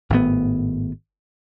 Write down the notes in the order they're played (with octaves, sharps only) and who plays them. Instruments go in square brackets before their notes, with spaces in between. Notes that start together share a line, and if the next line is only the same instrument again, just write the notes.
[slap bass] G#1 A2 D#3 B3